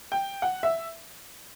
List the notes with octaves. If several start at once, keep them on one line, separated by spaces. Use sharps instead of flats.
G5
F#5
E5